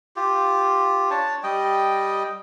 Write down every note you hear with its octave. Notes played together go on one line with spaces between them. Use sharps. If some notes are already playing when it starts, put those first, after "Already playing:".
F4 G4
D4 C#5 A5
G3 D#5 G5